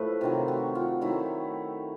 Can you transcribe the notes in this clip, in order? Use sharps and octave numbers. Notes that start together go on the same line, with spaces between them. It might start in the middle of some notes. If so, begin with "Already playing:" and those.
Already playing: A2 F3 A3 B4
C3 D#3 F#3 F4
F#4
F4
D#3 F#3 A3 E4